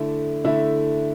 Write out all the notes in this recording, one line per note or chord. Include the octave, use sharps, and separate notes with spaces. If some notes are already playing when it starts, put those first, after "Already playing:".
Already playing: D3 A3 E4
D3 A3 E4